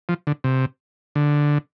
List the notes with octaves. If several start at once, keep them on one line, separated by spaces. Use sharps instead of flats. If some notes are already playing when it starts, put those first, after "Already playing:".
F3
D3
C3
D3